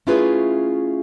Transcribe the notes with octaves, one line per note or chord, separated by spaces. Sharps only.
A3 C#4 E4 F4 G#4 B4